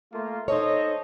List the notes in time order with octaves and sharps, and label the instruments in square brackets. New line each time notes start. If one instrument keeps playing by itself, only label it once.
[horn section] A3 A#3 F4
[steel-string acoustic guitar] D#4 C#5 [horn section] A4 C5 D#5